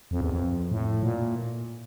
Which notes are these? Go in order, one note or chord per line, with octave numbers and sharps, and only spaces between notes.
F2
E2
F2
A2
A#2